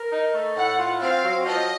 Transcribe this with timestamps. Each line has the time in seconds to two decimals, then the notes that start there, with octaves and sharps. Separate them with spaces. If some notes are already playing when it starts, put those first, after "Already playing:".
Already playing: A#4
0.12 D#4
0.34 A3
0.56 A2 F#5
0.79 F4
1.01 C4 F5
1.24 F#3
1.46 F3 D#5